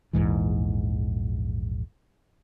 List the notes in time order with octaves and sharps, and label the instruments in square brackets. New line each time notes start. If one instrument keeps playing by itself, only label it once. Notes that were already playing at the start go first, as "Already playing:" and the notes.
[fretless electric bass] A#1 E2 G#2 E3